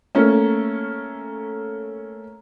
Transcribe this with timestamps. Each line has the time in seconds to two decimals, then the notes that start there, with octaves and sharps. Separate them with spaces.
0.15 A3 A#3 C#4